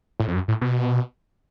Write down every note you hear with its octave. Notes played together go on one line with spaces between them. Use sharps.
A2
F2
F#2
A2
B2